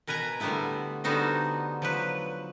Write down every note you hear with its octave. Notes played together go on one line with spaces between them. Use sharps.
B2 A#4 B4 G#5 A#5
D3 G3 A3 B3 E4
D3 G3 B3 D#4 F#4 C5
F3 F#3 B4